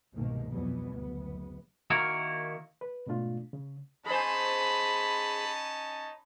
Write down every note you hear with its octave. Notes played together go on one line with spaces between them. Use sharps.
G1 C2 G#2 B2 D#3 A#3
F2 B2 E3 F#3 G3 B3
F#1 D2 B3
D#3 A#3 E4 F#4 A#4
B4
G#2 B2 A3 D4 F4
C#3
C#4 D#4 G#4 C5 A5 B5